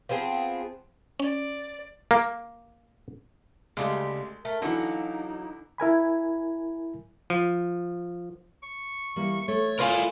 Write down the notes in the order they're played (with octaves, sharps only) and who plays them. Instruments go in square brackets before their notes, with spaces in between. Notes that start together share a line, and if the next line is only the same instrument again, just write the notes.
[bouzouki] F3 B3 C4 G#4
[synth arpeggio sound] C#4 [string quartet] D5
[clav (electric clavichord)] A#3
[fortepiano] D2 G#3 [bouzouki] C#3 G3
[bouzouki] A3 [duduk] A#4
[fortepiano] D3 E3 [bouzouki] F#3 A#3 [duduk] D#4
[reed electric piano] E4 A#4 G#5 B5
[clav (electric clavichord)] F3
[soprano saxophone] C#6
[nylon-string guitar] E3 G3 A#3
[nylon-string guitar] A3 [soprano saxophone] C#5
[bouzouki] F4 B4 [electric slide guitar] A#4 F5 G#5